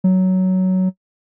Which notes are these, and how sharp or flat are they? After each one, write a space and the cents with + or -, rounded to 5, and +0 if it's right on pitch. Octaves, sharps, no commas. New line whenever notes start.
F#3 +10